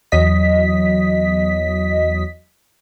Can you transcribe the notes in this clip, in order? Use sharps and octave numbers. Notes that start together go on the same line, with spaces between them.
E2 F#3 D#5 B6